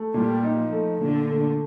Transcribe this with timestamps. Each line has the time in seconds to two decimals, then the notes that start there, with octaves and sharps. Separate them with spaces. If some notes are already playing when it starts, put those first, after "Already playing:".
Already playing: A3
0.14 A#2 G3
0.43 D#4
0.57 F3
0.72 A3
1.00 A#2 D3
1.30 A3